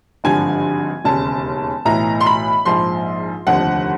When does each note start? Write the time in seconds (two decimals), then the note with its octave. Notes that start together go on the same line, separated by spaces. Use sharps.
0.24 G#1 G2 D3 F3 G#5
1.04 E1 D#2 C#3 A5
1.85 B1 A2 E3 A#5
2.21 C6
2.26 B5
2.65 A#1 G#2 F3 C6
3.47 F1 D#2 D3 F3 F#5